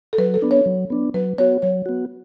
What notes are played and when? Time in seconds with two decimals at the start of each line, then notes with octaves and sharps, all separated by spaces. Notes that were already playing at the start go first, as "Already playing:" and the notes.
0.13 A4
0.18 F#3 B4
0.34 A4
0.42 B3 D4
0.51 C#5
0.66 F#3
0.90 B3 D4
1.14 F#3 B4
1.38 B3 F#4 C#5
1.62 F#3 C#5
1.86 B3 F#4